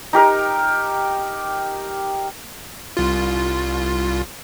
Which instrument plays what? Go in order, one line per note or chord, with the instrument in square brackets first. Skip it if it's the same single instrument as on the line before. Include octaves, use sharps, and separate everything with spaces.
[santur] D#4 G4 A#4
[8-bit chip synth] C2 F4